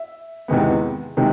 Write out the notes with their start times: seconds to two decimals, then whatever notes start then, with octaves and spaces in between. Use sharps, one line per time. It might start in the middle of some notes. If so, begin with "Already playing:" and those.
Already playing: E5
0.48 E2 C3 D#3 G#3 B3
1.17 C3 D#3 G#3